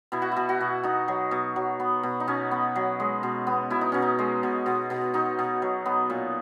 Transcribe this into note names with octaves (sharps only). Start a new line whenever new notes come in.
B2 E4
F#4
B2 E4
F#4
B2
B2 D#4
F#3
B2
F#3
B3
B2
D#4
B2 C#4
B3
F#3
G#3
B2
B3
B2 E4
D#4
B2 C#4
D#4
G#3
B2
B2
B2
B2 D#4
B2
F#3
B3
A#2